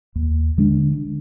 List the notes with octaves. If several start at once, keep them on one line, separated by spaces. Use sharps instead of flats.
D#2
D3 G#3 D4